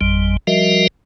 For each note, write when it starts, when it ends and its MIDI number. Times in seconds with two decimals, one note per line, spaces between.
0.01 0.37 32
0.01 0.37 41
0.01 0.37 55
0.47 0.87 53
0.47 0.87 55
0.47 0.87 66
0.47 0.87 70
0.47 0.87 75
0.47 0.87 76